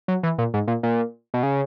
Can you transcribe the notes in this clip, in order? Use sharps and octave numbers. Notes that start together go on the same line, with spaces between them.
F#3
E3
A#2
G#2
A#2
A#2
B2
C#3